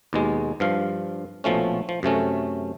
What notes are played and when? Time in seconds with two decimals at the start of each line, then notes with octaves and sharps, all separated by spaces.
0.13 D#2 B2 G#3
0.60 G2 F3 F5
1.44 A#1 B2 F3 A3 C#4
1.89 F3
2.03 F#2 C3 A3 C#4